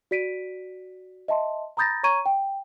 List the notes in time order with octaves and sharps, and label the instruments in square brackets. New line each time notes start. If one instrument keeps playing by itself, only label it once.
[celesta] F#4 D5 B6 D7 D#7
D#5 E5 A5 C6
A#5 B5 D#6 G6 A6 A#6
C#5 A#5 C#6 G#6 D#7
G5